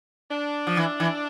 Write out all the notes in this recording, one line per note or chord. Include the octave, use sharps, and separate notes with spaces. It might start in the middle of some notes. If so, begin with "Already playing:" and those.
D4
F3
E3
E3